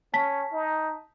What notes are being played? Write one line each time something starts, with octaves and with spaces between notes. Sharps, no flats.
C#4 A5 B6
D#4